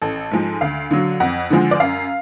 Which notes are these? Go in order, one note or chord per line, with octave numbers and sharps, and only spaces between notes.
A1 A4
G#2 F3 G#3
D2 F5
D3 F#3
F2 F#5
D3 F3 G#3
D5
F#2 F5